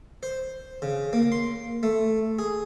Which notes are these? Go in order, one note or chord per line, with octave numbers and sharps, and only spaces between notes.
C5
C#3
A#3
C6
A3
G#4